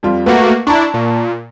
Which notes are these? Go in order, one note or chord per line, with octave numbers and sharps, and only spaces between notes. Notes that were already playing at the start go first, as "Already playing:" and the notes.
F2 G3 F4
A3 A#3 F#4 B4 F#5
D4 E4 A5 A#5 C#6
A#2